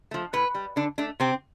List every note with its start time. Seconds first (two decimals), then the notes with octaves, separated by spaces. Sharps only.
0.11 F3 A3
0.33 A2 B4
0.54 G3
0.76 D3 D4
0.98 A3 D4
1.20 C3 C4